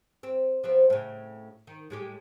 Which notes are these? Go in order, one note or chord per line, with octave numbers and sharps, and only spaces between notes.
C4
F3 B3 C4
A2 C#3
D#3
A2 G#3 G4